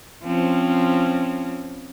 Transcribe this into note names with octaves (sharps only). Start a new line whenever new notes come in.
F3 C4 C#4